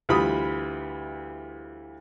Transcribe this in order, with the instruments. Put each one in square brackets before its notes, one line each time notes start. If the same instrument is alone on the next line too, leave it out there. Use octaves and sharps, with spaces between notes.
[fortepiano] D2 E3 G3 F4 B5 D#6